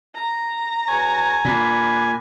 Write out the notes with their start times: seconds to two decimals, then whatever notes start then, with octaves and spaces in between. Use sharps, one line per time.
0.15 A#5
0.88 E2 F#4 C#5 G#5
1.45 A#2 D4 B5